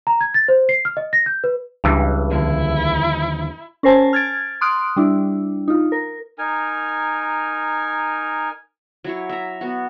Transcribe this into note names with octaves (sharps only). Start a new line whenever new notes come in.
A#5
G#6
A6
C5
C7
F6
D#5
A#6
G6
B4
C#2 G2 E3
D#2 D3 F3 E4
C#4 A#4 C5 G#5 A5
F6 G#6 A6 D7
C6 D#6 F6 F#6 D7
G3 D4 E4
D#4 F4
A#4
D#4 A#4 G#5
F#3 E4 C#5
E5 A#5
B3 F#4